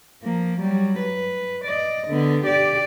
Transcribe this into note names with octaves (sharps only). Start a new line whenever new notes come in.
F3 A#3
F#3 G3
B4
D5 D#5
D3 B3
G4 D5